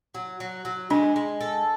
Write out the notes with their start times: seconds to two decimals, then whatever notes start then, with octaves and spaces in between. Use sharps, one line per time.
0.15 F#3
0.40 F#3
0.65 F#3
0.90 G#3 D4
1.16 G#3
1.41 A4